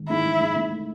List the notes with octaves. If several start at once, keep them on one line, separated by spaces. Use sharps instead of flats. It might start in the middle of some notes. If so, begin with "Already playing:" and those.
Already playing: G#1
G#2 E4
E3
G#2
G#2
A3